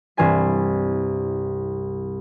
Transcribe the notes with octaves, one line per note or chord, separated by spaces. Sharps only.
C2 G2 E3 G#5 C7